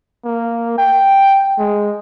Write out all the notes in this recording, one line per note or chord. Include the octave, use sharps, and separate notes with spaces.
A#3
G5
G#3